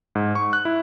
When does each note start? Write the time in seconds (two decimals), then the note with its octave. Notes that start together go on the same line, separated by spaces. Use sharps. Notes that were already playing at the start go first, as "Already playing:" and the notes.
0.15 G#2
0.35 C#6
0.53 F#6
0.65 E4